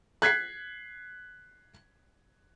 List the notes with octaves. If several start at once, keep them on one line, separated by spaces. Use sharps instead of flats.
F#6 G#6 B6 C7